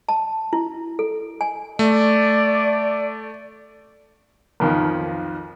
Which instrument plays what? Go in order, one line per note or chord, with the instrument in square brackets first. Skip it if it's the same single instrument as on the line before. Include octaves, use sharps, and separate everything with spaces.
[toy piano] A5
E4
A4
G#5
[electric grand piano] A3 [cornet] D5
[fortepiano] B1 F2 D#3 F3